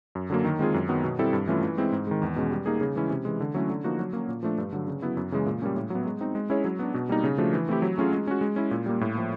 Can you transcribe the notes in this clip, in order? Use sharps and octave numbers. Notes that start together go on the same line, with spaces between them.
F#2
D3 F#3 A#3
D#3
G#3 C4 F4 G#4
F#2
D#3 F#3 B3
B2
G3 C4 E4 A4
G2
E3 A3 C#4 F4
E3
G#3 C4 E4
G#2
D#3 G#3
E2
B2 G#3 C#4
G3
A#3 D#4 G#4
C#3
E3 G#3 C#4 E4
C3
E3 G#3
D3
F#3 A3 C#4 E4
D3
F3 A#3 D#4 F#4
F#3
A#3 C#4
A#2
F3 A3 D4
G2
D3 F#3
C#3
F#3 B3 E4
F#2
C#3 E3 G#3
A#2
G3 A#3 C#4
A2
F#3 B3
G#3
C4 D#4
G#3
C#4 E4 G#4 C#5
F#3
B3 D4
B2
G3 A#3 D#4
C#3
F3 A3 D4 F#4
E3
A3 C4 E4 G4
F#3
A3 C#4 F4 G#4
G#3
C#4 F#4
G#3
C#4 E4
A#2
G3 A#3
A2
F3 A#3